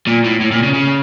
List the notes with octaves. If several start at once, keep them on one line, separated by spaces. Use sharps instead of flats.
A#2
A2
A2
A#2
C#3
C#3